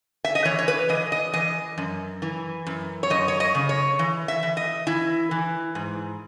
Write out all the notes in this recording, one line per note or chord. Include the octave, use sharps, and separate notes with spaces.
E5
D#5
E3 C#5
C#5
B4
E3 D#5
D#5
E3 D#5
F#2
E3
F#2
C#5
F#2 D#5
C#5
D#5
C#3
C#5
E3
E5
E3
D#5
E3 E4
E3
G#2